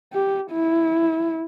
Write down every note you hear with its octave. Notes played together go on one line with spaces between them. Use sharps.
G4
E4